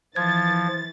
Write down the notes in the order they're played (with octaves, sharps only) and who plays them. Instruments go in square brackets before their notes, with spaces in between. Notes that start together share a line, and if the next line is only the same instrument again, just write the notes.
[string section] E3 A6 [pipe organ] F3 [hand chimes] G#6